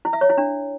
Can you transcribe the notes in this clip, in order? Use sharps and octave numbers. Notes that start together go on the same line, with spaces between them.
E4
E5
C#5
E4
D4